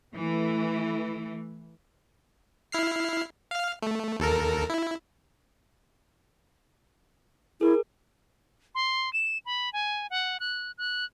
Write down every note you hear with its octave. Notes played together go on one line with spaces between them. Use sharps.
E3 A3
E4 F6 C7
F5 F6
A3
D#2 A4 A#4
E4
E4 G#4 A#4
C6
E7
B5
G#5
F#5
F#6
F#6